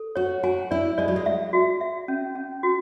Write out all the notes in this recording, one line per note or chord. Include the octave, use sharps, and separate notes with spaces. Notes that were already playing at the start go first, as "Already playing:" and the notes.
Already playing: A4
F#4 C#5
F#4 G#5
E4 D5
G#3 D5
F#3
G#3
E5
F#4
E5
C#4
C#4
F#4